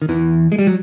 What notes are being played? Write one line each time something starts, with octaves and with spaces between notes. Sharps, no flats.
D#3
E2 E3
G#3
G3
F#3